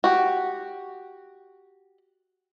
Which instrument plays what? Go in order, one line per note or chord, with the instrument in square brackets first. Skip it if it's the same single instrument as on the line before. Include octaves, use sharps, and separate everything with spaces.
[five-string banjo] F#4 G4